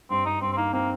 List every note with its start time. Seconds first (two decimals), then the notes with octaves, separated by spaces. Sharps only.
0.10 G2 C4
0.26 G2 D#4
0.42 G2 C4
0.52 C4
0.57 A#3 D#4
0.73 A#3 C4